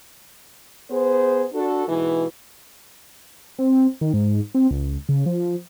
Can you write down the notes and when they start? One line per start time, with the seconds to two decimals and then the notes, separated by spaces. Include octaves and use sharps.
0.91 B3 G#4 C5
1.53 D4 F#4 A4
1.88 G#2 B2 E3
3.59 C4
4.01 D#3
4.13 G#2
4.55 C4
4.71 C#2
5.09 C#3
5.26 F3